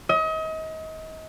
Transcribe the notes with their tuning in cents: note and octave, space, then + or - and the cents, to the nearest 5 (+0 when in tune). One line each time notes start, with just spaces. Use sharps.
D#5 +35